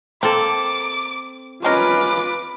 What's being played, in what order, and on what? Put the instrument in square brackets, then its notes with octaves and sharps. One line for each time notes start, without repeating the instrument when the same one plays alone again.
[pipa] A#3 [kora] C4 A4 [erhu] D6
[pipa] G#3 C#4 A#4 [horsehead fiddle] F4 B4 [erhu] D6